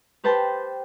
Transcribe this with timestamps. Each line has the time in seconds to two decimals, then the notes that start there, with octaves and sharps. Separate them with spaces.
0.24 G4 B4 C5 G5 A5